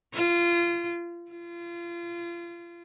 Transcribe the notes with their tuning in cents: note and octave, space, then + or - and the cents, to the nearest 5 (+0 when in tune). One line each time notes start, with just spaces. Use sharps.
F4 -25
F4 -30